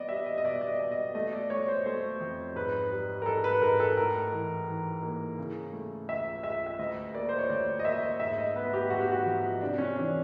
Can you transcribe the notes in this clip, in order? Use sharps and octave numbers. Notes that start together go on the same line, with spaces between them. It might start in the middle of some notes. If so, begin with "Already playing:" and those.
Already playing: B3 D5 D#5
G3 E5
D#5
D#5
B2 D5
D5
D#5
B2
D#5
A3 D#5
D5
A3 C#5
C5
A3 C5
F2
G#2 B4
G3
A#4
G#2 A4
B4
G#2 A#4
A4
A2 A#4
E3
E3
A#3
C#3
A3
C#2 E5
C#2 E5
E5
D2 D#5
A#3 D5
C5
C#5
D2 D5
D#5
A#3 E5
D#5
G#2 E5
D#5
B3 B4
G4
G#2 F#4
G4
F#4
F3
C3 D4
C#4
E3 D4